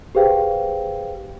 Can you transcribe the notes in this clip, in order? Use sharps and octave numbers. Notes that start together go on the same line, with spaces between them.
G4 G#4 B4 C5 F5 G5